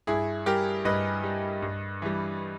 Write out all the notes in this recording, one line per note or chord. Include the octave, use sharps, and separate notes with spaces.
G2 E4 G#4
G3 G4 A#4
G2 B4 D#5
G3
G2
E3 G3